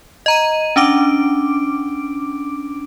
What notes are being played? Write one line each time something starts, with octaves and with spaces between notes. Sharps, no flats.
D#5 A#5 D#7
C#4 D4 D6 D7